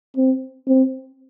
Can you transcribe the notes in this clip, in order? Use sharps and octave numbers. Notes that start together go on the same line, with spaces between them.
C4
C4